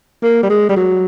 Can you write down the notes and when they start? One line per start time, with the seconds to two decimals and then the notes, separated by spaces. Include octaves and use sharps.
0.23 A#3
0.43 G3
0.50 G#3
0.69 G3
0.76 F#3